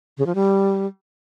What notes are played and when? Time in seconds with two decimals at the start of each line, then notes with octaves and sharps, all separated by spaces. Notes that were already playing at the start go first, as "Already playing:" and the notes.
0.18 C#3
0.26 F3
0.35 G3